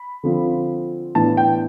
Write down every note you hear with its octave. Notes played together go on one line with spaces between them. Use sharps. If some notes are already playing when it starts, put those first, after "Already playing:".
Already playing: B5
D3 F3 C4 F4
A2 E3 B3 D4 A5
G5